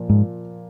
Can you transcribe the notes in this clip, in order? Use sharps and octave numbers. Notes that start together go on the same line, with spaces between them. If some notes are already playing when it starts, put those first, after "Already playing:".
Already playing: A#2 F3
G#2